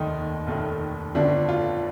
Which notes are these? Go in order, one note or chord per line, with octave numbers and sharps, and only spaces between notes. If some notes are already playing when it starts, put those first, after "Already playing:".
Already playing: F1 D#2 D#3 A3 D#4
F1 D#2 D#3 A3
G1 F2 D3 A3 D4
F4